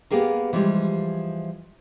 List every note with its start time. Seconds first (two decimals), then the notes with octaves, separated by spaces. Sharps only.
0.11 A#3 B3 G4 G#4 A#4
0.53 E3 F3 G3 G#3 G4